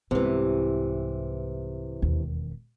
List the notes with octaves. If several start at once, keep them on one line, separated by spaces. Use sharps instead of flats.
C2 G#2 C3 E3
E1 D#2